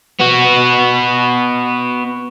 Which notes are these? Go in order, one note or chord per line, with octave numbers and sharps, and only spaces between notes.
B3 F#4